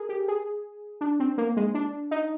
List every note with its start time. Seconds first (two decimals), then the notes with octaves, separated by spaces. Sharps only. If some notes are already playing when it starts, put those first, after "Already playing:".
Already playing: G#4 A#4
0.09 G4
0.28 G#4
1.01 D4
1.20 C4
1.38 A#3
1.57 G#3
1.74 D4
2.11 D#4